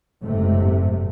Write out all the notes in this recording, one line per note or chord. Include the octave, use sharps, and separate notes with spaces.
F#1 G#2 C3 A3